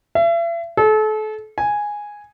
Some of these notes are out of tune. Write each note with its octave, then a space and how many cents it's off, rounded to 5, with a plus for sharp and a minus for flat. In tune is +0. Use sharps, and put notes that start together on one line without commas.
E5 +40
A4 -35
G#5 -5